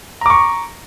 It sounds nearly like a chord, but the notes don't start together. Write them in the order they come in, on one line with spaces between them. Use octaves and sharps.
A#5 D6 C#6